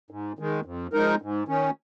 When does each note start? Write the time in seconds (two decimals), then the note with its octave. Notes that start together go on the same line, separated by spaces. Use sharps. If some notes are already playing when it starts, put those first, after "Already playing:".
0.10 G#2
0.39 D#3 G#3
0.65 F2
0.93 F3 G#3 D#4 A#4
1.22 G#2
1.48 D#3 C#4